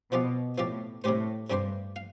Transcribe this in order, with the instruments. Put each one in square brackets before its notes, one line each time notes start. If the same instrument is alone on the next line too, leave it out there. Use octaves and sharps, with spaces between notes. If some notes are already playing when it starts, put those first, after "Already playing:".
[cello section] B2 [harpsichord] F3 C4 G4 D5 F5
[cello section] A2 [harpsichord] F3 C4 G4 D5 F5
[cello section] A2 [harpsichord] C3 G3 D4 G4 C5
[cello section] G2 [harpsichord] C3 G3 D4 G4 C5
[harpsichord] F5